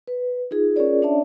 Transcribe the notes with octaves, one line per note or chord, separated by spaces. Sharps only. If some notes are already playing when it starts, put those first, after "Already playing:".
B4
D#4 F4 G#4
C#4 F4 G#4 A#4 C#5 D5
C#4 D4 C#5 D5 E5 A5